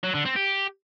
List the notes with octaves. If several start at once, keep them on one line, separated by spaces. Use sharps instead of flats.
F#3
D3
C4
G4